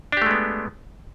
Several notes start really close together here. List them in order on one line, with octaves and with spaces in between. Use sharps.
D4 G4 A3 G#3 B3